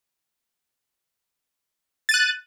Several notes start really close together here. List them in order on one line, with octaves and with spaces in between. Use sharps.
A6 D#7 F#6